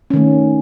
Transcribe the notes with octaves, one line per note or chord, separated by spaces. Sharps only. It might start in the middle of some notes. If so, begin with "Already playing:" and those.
D#3 A3 C#4